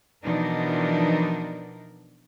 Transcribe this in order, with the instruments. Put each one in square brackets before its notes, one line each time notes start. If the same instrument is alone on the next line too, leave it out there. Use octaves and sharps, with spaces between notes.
[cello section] B2 E3 F3 D4 D#4 A#4